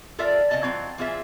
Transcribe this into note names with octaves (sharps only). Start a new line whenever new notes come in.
F4 A4 A#4 D5 E5
C#3 D5 D#5 A5
E3 F#3 C4 F4
E3 C4 F4 G#4 E5